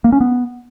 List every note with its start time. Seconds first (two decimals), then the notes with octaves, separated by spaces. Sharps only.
0.04 A#3
0.12 C#4
0.20 B3